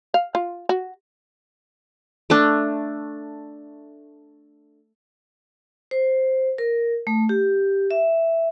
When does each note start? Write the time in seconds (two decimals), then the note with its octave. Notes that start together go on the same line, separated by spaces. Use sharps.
0.14 F5
0.35 F4
0.69 F#4
2.30 A3 D4
5.91 C5
6.58 A#4
7.07 A3
7.29 G4
7.91 E5